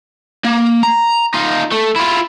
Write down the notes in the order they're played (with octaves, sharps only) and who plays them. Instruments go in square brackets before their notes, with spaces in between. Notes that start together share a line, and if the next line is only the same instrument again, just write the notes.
[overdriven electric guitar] A#3
A#5
D#4 F4
A3
E4 F4